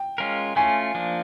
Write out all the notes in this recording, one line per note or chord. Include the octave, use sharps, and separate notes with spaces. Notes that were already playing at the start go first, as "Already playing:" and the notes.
Already playing: G5
G#3 C#4 F4 A#4
A3 C#4 F4 G#5
F3 A#3 D4